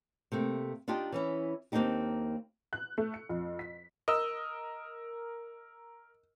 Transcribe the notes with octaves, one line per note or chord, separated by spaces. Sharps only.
C3 A3 A#3
D4 D#4 F4 G4 D#5
E3 C#4 E4
D#2 A#3 C4 D4 D#4 G4
F#6
A3
C#7
F2
B6
A#4 D#5 E6